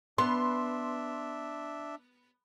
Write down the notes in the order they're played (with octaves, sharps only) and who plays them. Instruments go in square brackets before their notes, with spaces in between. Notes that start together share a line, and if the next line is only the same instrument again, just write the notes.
[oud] B3 [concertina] D4 E5 [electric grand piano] C6